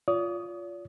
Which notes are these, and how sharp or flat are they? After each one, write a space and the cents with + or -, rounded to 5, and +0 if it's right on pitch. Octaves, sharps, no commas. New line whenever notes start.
F4 +0 D5 -45 D#6 +0